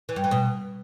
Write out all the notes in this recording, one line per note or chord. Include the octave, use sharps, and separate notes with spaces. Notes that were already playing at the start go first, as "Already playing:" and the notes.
E3
G2
E3
B2